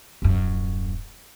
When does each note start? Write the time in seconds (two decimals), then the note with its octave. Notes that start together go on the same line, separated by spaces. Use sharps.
0.22 D#1 F#2